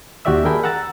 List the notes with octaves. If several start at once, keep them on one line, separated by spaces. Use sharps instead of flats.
D#2 F#4 G4 D5 E5 E6
D4 G#4 A#4 G5 G#5 B5
F#5 A#5 E6 A6